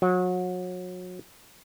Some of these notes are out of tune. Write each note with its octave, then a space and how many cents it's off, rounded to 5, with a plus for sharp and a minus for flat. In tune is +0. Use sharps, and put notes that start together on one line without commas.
F#3 -30